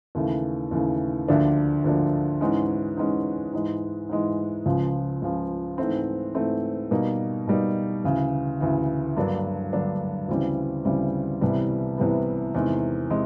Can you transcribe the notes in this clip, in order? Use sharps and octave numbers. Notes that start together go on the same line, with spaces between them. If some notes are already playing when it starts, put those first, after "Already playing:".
D#2 C#3 E3 A3
D#2 C#3 E3 A3
D2 D3 F3 A#3 D4
D2 D3 F3 A#3 D4
G#2 E3 G#3 C#4
G#2 E3 G#3 C#4
G#2 E3 G#3
G#2 E3 G#3
C#2 C#3 F3
C#2 C#3 F3
G#2 E3 A3 C4
G#2 E3 A3 C4
B2 G3 A#3 D#4
B2 G3 A#3 D#4
D2 C#3 E3
D2 C#3 E3
G2 D3 F#3 A#3 D4
G2 D3 F#3 A#3 D4
D2 C#3 E3 G3 C4
D2 C#3 E3 G3 C4
C2 C3 E3 G3 B3
C2 C3 E3 G3 B3
E2 C3 D#3 G#3
C3 G#3